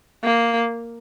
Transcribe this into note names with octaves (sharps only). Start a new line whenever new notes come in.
A#3